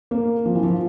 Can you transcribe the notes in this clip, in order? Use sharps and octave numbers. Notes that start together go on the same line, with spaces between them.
A#3
F3
E3
F3